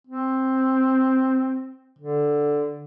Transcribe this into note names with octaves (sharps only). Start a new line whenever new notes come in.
C4
D3